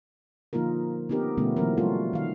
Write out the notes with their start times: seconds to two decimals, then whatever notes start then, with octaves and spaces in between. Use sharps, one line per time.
0.53 D3 F3 A#3 D#4 F4 A#4
1.09 B3 C4 D#4 G4 A#4
1.37 B2 D3 F3 A3 B3 C#4
1.56 E3 F#3 A#3 C4 A#4
1.77 G3 A3 C#4 F4 F#4 A4
2.13 D#3 F5